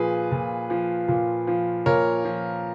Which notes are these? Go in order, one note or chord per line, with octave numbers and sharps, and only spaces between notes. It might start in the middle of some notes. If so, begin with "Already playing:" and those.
Already playing: A#2 F3 G#4 B4
A#2
F3
A#2
F3
A#2 A#4 C#5
F3